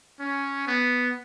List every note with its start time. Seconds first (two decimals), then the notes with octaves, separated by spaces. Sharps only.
0.20 C#4
0.67 B3